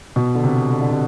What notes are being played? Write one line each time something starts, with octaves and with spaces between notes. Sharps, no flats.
B2
D3
C3
D3
D3
C3